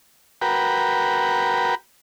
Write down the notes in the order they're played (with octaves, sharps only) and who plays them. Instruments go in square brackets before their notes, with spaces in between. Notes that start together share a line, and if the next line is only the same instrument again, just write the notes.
[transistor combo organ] F#4 A#4 B4 G5